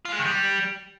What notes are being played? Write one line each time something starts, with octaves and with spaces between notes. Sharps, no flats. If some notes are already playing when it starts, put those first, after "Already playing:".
F4
G#3
D#3
G3